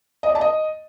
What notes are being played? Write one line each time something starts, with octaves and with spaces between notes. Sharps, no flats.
D#5
D5
A5
D#5